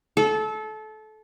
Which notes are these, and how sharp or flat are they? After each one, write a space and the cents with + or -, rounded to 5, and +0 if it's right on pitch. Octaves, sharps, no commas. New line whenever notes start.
A4 -25